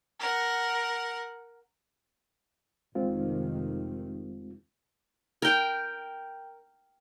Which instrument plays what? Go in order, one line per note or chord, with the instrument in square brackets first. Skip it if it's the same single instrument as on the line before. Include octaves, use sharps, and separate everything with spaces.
[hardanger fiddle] A#4 F#5
[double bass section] F1 C3 D#3 [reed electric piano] G#3 C4 F4
[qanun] A#4 G5